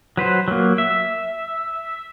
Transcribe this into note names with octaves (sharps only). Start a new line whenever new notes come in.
F#3 B4 C5
F#3 A#3
E5